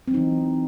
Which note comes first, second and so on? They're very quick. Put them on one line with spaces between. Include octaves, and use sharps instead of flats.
C4 F#3 D#4 E3